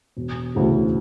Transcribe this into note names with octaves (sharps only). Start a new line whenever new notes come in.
E1
D2 C#3 E3